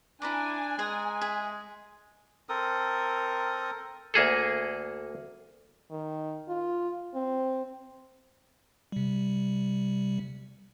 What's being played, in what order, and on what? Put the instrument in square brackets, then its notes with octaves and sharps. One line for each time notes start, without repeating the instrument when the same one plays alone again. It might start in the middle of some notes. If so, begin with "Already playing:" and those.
[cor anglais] D4 [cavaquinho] E4 A#5 D6 [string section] G#5
[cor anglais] G#3 [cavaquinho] G#4 A#5 D#6
[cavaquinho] G#4 E5
[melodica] C4 A4 A#4 D#6
[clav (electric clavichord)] D2 A#3 G#4 A4
[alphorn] D#3
F4
C4
[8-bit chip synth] C3 G3